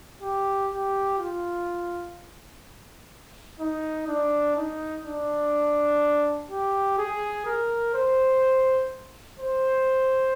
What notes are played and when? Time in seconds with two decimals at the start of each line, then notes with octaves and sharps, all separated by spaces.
0.22 G4
0.71 G4
1.18 F4
3.60 D#4
4.08 D4
4.56 D#4
5.05 D4
6.50 G4
6.98 G#4
7.46 A#4
7.94 C5
9.39 C5